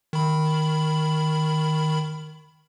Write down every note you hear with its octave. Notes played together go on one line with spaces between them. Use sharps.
D#3 B5